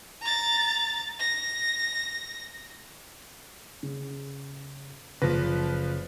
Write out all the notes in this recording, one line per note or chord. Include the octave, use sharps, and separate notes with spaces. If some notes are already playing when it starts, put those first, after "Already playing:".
A#5 A6
A#6
C#3
F#1 F3 B4 A#6